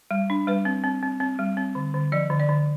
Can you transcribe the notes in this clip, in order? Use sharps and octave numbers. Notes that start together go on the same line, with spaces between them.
G3
D4
G3 B4
C4
C4
C4
C4
G3
C4
D3
D3
F3 D5
D3
D5
D3